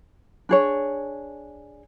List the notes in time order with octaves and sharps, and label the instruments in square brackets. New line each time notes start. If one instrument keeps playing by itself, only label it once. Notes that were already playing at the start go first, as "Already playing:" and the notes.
[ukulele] D4 G#4 C#5